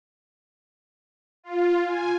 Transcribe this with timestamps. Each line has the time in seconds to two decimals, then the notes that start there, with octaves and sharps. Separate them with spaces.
1.44 F4
1.86 G#5